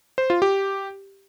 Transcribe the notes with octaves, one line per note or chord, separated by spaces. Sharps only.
C5
F4
G4